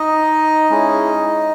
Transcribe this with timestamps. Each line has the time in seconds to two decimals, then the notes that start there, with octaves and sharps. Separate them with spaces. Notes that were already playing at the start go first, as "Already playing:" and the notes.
Already playing: D#4 D#5
0.70 G#3 C#4 E4 G#4